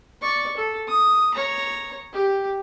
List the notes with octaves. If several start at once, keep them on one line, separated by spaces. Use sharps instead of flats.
D5 C#6
A4
D#6
C#5 A#5
G4